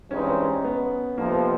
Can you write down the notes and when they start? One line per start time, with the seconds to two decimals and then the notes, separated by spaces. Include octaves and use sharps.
0.10 G2 E3 G#3 C4 C#4 D#4
0.64 B3
1.18 F2 C3 F3 A#3
1.31 B3